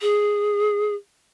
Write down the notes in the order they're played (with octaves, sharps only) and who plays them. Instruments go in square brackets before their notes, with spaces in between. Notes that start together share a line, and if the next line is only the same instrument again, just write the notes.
[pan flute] G#4